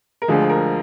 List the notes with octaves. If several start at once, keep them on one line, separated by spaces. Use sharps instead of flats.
A#4
D2 D3 F3 G#3 G#4
A#4